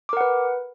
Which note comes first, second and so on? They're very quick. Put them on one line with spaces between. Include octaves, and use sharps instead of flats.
D6 A#4 F#5 B4